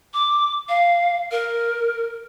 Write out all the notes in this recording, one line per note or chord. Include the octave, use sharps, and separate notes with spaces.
D6
F5
A#4